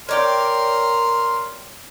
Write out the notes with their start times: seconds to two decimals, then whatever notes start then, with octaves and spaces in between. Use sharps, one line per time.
0.09 A#4 C#5 D5 G5 C6 F6